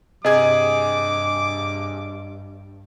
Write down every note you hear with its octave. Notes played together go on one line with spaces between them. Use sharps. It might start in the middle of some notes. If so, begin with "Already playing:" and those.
G2 C3 G#4 D#5 D6 G#6